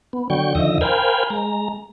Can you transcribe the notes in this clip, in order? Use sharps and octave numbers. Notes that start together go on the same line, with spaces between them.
B3
D3 F#3 G5 C#6
D#2 D3 F3 D#5 E5 A#6
A#4 C5 F5 G5 G#5 B5
G#3 A#5